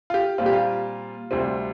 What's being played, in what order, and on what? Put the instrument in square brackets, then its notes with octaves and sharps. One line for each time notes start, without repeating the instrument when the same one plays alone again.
[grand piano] F4
G4
A#2 G3 C4 F4
G4
F4
D2 C3 G3 C4